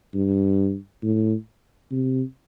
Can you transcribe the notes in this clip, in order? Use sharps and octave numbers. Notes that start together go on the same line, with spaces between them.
G2
A2
C3